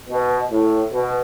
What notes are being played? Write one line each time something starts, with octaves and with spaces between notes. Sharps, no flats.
B2
A2
B2